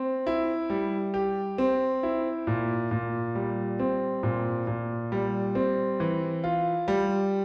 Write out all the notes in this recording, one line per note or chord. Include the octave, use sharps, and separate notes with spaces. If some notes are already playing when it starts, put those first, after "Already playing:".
Already playing: C4
E4
G3
G4
C4
E4
A#2
A#2
G3
C4
A#2
A#2
G3
C4
E3
F4
G3